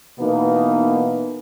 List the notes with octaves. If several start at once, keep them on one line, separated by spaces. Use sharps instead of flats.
B2 E3 A#3 B3 D#4